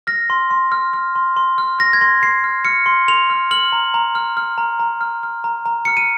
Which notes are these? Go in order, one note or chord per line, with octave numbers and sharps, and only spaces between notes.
F6 A#6
C6
C6
F6
F6
C6
C6
F6
F6 A#6
G#6
C6 A#6
C6 C7
F6
F6 C#7
C6
C6 F7
F6
F6 F#7
A#5
A#5
F6
F6
A#5
A#5
F6
F6
A#5
A#5
F6 C#7
D#7